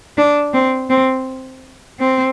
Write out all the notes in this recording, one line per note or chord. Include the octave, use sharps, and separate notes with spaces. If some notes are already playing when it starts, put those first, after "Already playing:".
D4
C4
C4
C4